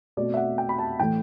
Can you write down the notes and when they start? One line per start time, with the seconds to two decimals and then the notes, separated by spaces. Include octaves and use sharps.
0.17 B2 A3 C4 D5
0.34 E5
0.37 F#5
0.58 G5
0.69 B5
0.79 A5
0.99 A2 E3 A3 G5